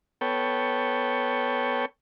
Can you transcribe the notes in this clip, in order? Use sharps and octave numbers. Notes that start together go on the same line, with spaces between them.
B3 A4 C#5 G5